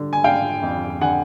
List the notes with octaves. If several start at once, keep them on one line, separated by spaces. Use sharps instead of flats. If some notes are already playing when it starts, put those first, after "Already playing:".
Already playing: D3 G3
G#5
D3 F5 G5
F2
D3 F#5 G#5